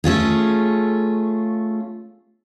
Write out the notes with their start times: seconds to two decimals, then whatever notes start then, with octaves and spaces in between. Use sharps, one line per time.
0.04 A3 C#4 F4 G#4